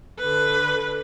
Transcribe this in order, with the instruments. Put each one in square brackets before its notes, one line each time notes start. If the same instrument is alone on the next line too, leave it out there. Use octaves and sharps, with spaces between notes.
[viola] D3 B4